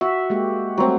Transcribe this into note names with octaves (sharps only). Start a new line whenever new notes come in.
F#4 E5
G#3 A#3 G4
F#3 G3 A3 C4